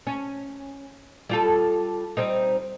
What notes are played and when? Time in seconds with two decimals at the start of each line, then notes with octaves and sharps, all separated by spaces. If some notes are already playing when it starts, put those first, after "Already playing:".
0.07 C#4
1.29 G3 F4 A4
2.17 G3 C4 D#4